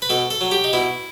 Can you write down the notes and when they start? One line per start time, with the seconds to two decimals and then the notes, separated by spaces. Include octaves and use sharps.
0.02 B4
0.10 B2 A4
0.30 A4
0.41 F#3
0.51 G4
0.64 D#4
0.73 B2 E4